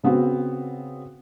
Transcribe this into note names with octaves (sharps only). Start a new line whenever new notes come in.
C#3 B3 C4 F#4